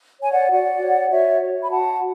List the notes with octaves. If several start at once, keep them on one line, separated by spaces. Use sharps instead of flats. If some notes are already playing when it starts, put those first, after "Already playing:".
C#5 G#5
D5 F#5
F#4 D5 F#5
C#5
F#4 C#5 E5
C#5
B5
F#4 F#5 A5